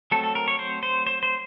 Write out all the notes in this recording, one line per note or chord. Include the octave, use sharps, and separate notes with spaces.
F#3 A3 C4 A4
A4
A#4
C#5
C5
C5
C5
C5